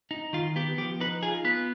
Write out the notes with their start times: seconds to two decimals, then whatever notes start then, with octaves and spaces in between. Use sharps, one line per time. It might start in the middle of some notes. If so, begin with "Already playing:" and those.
0.11 D#4
0.33 D#3 F4
0.56 B3 G4
0.78 F3 G4
1.00 D#4 B4
1.23 F4 G#4
1.44 B3 B4